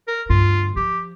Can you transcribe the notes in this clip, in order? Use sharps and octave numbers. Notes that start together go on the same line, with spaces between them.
A#4
D2 G2 F4
F3 G4